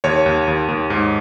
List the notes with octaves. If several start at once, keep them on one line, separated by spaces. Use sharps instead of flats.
D#2 C#5
D#2
D#2
D#2
G#2